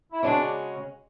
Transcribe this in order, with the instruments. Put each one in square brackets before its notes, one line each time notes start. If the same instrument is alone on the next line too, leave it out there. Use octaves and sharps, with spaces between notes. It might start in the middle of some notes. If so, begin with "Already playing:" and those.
[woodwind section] E4
[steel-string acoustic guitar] C#3 G#3 C#4 F#4 [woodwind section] D4